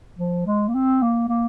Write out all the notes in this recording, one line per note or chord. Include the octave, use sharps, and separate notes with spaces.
F3
G#3
A#3
C4
A#3
A#3